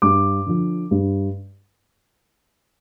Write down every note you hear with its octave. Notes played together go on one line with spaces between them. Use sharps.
G2 D6
D3 F3
G2